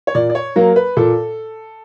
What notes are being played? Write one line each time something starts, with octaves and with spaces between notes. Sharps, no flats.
C#5
A#2 D5
D5
C#5
F#3 A#3 A#4
B4
A#2 A4